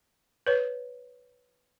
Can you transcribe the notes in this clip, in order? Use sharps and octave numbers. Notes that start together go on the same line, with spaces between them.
B4 C#5